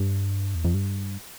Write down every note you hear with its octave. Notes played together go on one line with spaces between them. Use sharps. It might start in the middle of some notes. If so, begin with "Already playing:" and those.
Already playing: G2
E2
F2
G2